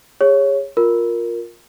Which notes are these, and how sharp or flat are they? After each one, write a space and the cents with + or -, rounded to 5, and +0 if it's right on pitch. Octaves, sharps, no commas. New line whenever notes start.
G#4 -35 C#5 -5
F4 +15 A#4 +0